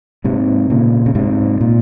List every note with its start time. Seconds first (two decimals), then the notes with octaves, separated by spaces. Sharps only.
0.24 G#2 C3
0.70 A#2 C#3
1.06 C#3
1.15 G#2 C3
1.61 A#2